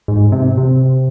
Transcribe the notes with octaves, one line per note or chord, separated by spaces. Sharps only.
G#2
C3
C3